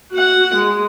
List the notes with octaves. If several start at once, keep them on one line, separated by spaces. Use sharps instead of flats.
F#4 F#5
G#3